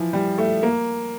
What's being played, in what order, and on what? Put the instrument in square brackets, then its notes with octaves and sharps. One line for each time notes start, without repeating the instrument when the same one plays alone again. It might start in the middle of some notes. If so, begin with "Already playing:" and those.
Already playing: [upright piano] E3 F3
G3
A3
A#3